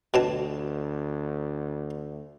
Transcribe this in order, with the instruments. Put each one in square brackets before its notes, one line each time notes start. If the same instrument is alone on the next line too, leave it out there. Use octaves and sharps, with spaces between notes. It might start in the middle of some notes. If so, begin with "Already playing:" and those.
[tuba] D2 [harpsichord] B2 F#3 A5